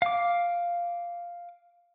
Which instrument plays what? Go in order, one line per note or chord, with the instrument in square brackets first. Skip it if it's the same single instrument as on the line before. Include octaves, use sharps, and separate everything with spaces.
[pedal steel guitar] F5 D6